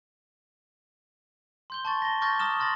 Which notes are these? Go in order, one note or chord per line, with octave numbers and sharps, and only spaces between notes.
C6 G6 G7
A5 C6 C#6 A6
A#6 G7
C#6 D6 F6 G6 A6 A#6
A#5 D6 D#6 F6 E7 G7
C6 F6 A6 A#6 F#7